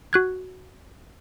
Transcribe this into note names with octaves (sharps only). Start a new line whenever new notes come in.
F#4 F#6 G#6